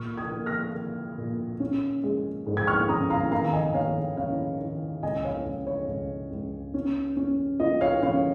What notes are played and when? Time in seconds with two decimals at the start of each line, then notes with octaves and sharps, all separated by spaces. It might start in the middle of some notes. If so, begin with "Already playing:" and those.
Already playing: A#2 C#6 F6
0.18 D#6 G#6
0.32 A#3
0.46 F6 A#6
0.75 A#3
1.18 A#2
1.60 C#4
2.04 G#3
2.47 G#2
2.57 G#6
2.67 C#6 F6
2.89 C#4 A#5 D#6
3.10 F5 A#5
3.32 D#3 F5 A#5
3.48 A#5
3.53 D#5 G#5
3.74 D#3 C#5 F5
4.17 C#4 C#5 F5
4.60 D#3
5.03 C#2 D#5 G#5
5.24 C#5 F5
5.46 C#2
5.67 C#5
5.88 C#2
6.31 C#2
6.74 C#4
7.17 C#4
7.60 F4 D#5
7.81 C#5 F5
8.02 C#4 C#5 F5